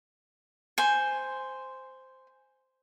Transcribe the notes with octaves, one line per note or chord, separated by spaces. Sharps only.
C5 G#5